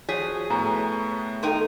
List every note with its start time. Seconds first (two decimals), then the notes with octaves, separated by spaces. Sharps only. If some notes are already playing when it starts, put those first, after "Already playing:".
0.09 F3 F#4 G#4 C#5 B6
0.50 A2 A3 B3 A#5
1.43 D#4 A4 A#4 G5 C6